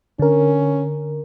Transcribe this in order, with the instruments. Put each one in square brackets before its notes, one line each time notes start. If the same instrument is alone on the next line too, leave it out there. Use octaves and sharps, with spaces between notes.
[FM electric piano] D3 A#4 [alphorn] C#4